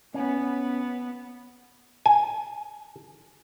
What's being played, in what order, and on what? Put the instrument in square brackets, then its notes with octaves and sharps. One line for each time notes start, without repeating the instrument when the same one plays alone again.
[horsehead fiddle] B3 [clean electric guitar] C#4
[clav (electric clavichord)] G#5